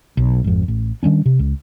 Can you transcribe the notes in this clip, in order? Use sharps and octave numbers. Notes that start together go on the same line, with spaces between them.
B1
G#1 F2
A1
D#3 G3 C#4 D4
C3
C#2